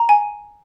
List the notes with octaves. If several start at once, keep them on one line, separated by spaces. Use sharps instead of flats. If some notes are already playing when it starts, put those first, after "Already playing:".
Already playing: A#5
G#5